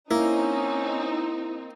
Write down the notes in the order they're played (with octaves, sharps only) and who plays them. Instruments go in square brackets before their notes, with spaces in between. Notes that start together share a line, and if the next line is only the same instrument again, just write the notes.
[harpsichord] A#3 [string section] C4 D#4 [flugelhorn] C#4 [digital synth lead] E4